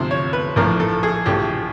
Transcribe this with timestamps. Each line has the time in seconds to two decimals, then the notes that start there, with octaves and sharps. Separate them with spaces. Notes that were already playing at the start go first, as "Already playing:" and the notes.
Already playing: D2 C3 F3 C5
0.11 C#5
0.33 B4
0.56 A#1 A2 F3 A#4
0.80 A4
1.03 G#4
1.26 A#1 A2 F3 G4